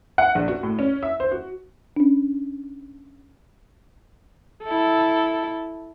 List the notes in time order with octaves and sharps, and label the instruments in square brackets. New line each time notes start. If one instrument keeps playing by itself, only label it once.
[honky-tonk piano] F#5
A#1
F#4
A2
C#4
E5
C5
F#4
[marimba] C#4 D4
[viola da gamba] E4 A4